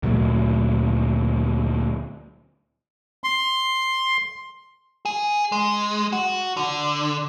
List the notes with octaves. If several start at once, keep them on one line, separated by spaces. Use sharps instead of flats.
D2 A#2 F#3 A3
C6
G#4
G#3
F#4
D3